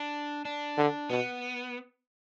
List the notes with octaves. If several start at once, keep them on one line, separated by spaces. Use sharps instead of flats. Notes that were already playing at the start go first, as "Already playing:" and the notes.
Already playing: D4
D4
D3
B2 B3